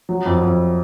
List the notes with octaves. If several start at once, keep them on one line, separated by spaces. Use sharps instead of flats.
F#3
F2
F2